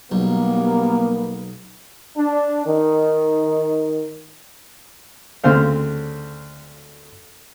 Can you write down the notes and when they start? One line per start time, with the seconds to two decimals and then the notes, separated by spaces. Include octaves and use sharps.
0.12 B1 G3 A#3 B3
2.17 D4
2.66 D#3
5.44 D2 C#3 C4 C5 F5